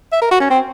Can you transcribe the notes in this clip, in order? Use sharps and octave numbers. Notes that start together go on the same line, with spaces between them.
E5
A#4
F#4
C#4
C4